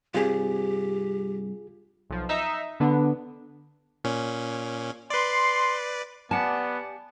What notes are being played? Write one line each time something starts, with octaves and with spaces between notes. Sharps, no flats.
G2 C3 C4 F4 G4 G#4
B1 F3
D#4 E5
D3 B3 D4
A#2 C#4
B4 D5 C6
B3 G4 D5 F#5 G#5 A5